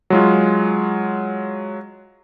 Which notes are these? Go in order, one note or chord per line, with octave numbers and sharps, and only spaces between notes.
F#3 G#3 F4